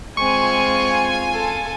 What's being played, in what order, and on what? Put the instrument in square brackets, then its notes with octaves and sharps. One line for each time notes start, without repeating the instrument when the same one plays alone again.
[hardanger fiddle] G#3 C4 [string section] F4 G#5 [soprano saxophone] C#6
[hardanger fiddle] A4